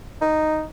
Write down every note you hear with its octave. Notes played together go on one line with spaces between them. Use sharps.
D#4